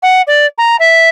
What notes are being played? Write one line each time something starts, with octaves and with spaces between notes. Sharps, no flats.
F#5
D5
A#5
E5